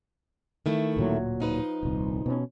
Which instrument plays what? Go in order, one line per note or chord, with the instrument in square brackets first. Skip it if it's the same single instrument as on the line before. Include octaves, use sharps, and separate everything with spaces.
[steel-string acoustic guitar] D#3 A3 E4
[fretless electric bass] D1 A#2 F#3
[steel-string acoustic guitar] F3 D#4 B4
[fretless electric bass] D#1 C2
B2 C4 C#4